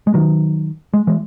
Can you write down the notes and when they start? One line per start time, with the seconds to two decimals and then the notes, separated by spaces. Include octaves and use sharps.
0.07 G#3
0.14 D#3 F#3
0.94 G#3
1.07 E3 G#3